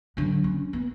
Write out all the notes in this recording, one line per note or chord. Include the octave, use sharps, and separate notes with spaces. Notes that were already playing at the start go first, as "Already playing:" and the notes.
D3 F#3
C#4
B3